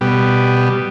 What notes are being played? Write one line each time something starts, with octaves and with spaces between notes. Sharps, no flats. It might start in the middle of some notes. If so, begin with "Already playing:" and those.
B2 G3